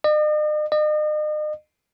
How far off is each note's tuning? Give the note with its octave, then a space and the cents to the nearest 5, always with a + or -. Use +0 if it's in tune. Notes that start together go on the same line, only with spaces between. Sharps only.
D#5 -45
D#5 -40